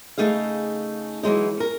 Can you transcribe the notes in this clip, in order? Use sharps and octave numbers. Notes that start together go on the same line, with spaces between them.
C#3 A3 D#4 G#4 F5
E3 F#3 G#3 D#4
C#4 A#4